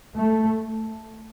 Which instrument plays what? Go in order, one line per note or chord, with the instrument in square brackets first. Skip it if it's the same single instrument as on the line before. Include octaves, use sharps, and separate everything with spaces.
[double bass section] A3